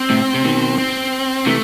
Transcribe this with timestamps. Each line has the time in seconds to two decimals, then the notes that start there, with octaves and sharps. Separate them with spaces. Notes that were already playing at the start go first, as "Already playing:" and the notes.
Already playing: C4
0.10 A2 C3
0.34 C3
0.44 B2 D#3
0.78 C4
1.46 C3 E3 A3